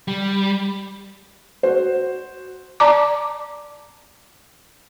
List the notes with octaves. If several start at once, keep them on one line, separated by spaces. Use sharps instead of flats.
G3
F#4 C5
D5 A5 A#5 D6